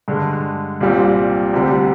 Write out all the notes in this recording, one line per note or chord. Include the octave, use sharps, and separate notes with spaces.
G2 D3 G#3
C2 A#2 G3 C4
D2 C3 G3